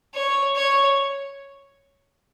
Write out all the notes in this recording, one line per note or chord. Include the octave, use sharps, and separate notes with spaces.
C#5
C#5